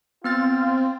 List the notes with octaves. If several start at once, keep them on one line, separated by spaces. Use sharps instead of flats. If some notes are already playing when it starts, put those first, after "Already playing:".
B3 C4 F4 F6 A6